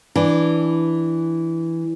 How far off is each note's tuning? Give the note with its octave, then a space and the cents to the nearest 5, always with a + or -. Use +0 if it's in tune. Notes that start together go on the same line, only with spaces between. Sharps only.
E3 +0 D4 +0